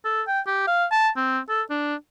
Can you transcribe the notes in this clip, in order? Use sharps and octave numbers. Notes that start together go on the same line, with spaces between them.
A4
G5
G4
F5
A5
C4
A4
D4